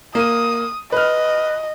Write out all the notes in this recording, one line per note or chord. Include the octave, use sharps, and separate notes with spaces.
A#3 D#6 D#7
B4 D#5 F6